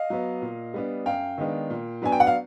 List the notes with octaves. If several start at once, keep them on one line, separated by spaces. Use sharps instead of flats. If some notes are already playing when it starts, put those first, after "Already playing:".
Already playing: D#5 F5
F#3 B3
A#2
G3 B3 D4
F#2 F5 G5
D#3 G#3 B3 D4
A#2
F#3 B3 D4 G#5
G5
F#5
F5